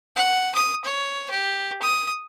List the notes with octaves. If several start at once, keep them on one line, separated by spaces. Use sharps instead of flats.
F#5
D#6
C#5
G4
D#6